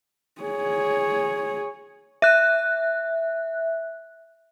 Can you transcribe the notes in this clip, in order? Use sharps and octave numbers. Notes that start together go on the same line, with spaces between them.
G#4 C#5
E5 F#6